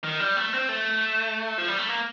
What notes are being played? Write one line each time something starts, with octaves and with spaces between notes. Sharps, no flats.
D#3
G3
A3
C4
A3
F3
G3
A3
A#3